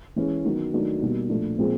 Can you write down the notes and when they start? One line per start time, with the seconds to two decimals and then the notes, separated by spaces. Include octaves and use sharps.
0.16 E3 G#3 C#4
0.44 D#3 F#3 B3
0.73 D#3 F#3 A3 D4
1.01 B2 G3 A#3 D#4 F#4
1.29 A#2 F3 A3 D4
1.58 A#2 F3 G#3 C4 F4